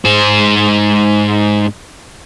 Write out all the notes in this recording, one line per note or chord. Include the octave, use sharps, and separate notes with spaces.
G#2 C5